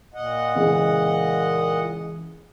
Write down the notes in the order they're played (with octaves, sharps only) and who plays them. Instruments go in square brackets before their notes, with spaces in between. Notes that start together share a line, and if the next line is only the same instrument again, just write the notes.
[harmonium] A#2 D#5 F#5
[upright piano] C#3 E3 G#3